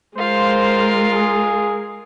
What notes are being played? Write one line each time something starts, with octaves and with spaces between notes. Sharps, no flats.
G#3 F4 A#4 C5 F5
G#4